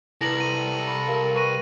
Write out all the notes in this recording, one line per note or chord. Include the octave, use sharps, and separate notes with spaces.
C2 E4 A4 B4 A#6 F#7
D#7
B5
G4 A#4 F5
B4 C#6 F#6 A#6 D#7